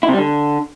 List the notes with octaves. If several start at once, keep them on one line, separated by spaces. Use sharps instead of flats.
E4
C3
G3
D3